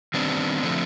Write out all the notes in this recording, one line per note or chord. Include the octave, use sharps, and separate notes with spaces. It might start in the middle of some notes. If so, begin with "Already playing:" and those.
D#3 G3 B3 C4 D4
D3 F3 A3